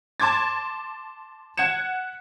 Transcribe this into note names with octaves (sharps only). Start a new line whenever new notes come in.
A5 C6 D6 G#6 A6
F#5 G#6 C#7 E7